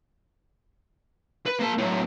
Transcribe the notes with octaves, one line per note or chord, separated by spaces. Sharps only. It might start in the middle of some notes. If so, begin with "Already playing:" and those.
B4
A#3 A5
A2 F#3